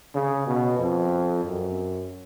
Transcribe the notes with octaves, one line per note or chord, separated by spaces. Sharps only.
C#3
B2
F2
F#2